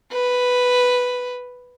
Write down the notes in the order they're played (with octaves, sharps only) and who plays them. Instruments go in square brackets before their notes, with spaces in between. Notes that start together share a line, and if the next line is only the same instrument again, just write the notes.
[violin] B4